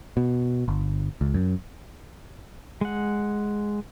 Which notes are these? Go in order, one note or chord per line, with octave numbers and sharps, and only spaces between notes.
B2
G1
C#2
F#2
G#3 F#5